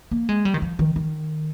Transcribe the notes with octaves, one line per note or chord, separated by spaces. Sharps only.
A#3
G#3
G3
D#3
F3
D#3
D#3